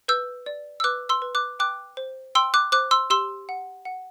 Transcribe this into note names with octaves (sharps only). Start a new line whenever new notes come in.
B4 E6 G6
D5
E6
B4 D6 F#6
C6 E6
B4
D6 F#6
G5 D6 F#6
C5
G5 C6 E6
D6 F#6
C5 D6 F#6
C6 E6
G4 C6 E6
F#5
F#5